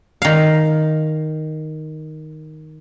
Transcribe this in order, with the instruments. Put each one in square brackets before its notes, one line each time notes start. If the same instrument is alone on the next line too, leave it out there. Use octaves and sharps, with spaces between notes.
[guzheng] D#3 F5